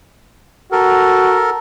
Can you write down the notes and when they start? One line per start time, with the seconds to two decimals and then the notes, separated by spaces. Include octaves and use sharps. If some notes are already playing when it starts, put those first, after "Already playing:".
0.72 F#4 A4 A#4